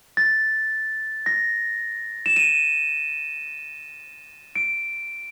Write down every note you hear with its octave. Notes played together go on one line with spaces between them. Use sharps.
A6
A#6
E7
D#7
D7